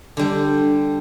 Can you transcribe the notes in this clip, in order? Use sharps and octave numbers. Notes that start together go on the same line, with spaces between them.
D3 G3